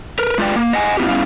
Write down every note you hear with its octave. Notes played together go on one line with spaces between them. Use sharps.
A#4 B4
G#3 F4 B4 D5 G5
A#3
D#5 F#5 G#5
B3 C4 E4 F4 G4
G3 B3 C#4 E4 F5